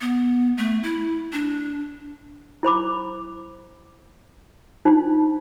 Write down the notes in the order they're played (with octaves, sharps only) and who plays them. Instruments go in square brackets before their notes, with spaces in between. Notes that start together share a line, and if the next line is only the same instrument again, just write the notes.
[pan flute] B3
A3
E4
D4
[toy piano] E4 C5 B5 D6
D4 D#4 F4 C5